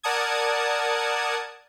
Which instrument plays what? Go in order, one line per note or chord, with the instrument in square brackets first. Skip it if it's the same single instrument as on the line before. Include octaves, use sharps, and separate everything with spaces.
[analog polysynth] A#4 D5 F#5 A5 D#6 G#6